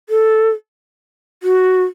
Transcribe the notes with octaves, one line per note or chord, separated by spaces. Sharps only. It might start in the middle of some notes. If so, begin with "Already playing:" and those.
A4
F#4